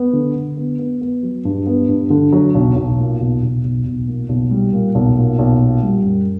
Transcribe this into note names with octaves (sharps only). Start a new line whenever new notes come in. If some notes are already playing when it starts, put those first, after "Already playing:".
Already playing: B3
D3
D3
B3
B3
B3
F#3
G2
B3
G2
D3
F#3
B1
B1
A#2
B1
B1
B1
B1
A#2
B1
G3
A#2
B1
A#2
B1
A#2
G3
F#2